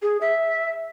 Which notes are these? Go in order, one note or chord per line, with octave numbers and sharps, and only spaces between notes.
G#4
E5